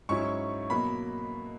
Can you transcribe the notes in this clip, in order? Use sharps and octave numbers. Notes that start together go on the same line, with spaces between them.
G#2 F#3 C#4 E4 C#6
B2 F#3 A#3 B5